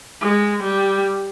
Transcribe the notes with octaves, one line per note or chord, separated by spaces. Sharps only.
G#3
G3